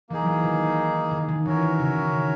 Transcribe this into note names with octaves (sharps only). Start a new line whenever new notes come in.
E3 A#3 D#4 G#4
F#3
E3
D#3
D#3
D#3
E3 C#4 F#4 A#4 C#5 E5
D#3
C#3
C#3
D#3